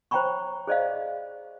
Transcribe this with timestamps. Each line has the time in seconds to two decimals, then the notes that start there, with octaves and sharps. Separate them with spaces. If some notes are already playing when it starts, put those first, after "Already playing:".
0.11 C5 C#5 G5 A#5 B5 C#6
0.67 G#4 C5 D5 D#5 F5